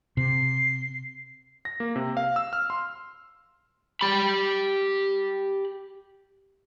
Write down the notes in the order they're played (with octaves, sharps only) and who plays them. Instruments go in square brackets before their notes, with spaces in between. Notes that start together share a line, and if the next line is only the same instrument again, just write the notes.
[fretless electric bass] C3 [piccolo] C7
[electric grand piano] A#6
A#3
C3
F5
E6
F6
C6
[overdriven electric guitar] G4 B5